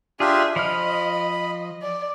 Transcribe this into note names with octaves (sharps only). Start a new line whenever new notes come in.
D4 F4 G4 G#4 E5
F3 D#5 B5 F6
D5